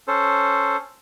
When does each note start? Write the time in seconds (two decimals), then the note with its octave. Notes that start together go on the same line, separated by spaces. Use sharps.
0.08 C#4 A4 C5